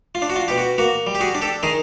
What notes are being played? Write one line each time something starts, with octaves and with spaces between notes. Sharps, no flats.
F4
D4
F#4
F4
B2 G4
F#4
A#3 F#4
G3
G4
F#4 G#4
D4
G4 A4
D#3 G#4 A#4